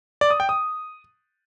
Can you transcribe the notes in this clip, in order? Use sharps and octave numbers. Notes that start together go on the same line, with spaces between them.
D5
D#6
G5
D#6